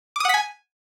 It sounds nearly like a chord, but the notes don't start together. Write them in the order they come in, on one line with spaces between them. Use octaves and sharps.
D6 D#6 F#5 B6 G#5